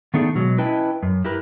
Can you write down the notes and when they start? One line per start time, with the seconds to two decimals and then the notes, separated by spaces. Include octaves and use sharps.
0.14 D#3 A3 B3 D4 D#4 G#4
0.35 B2 F#3 G#3
0.58 C#4 E4 B4 D#5 G5 A5
1.03 F#2
1.25 E4 G4 A#4 B4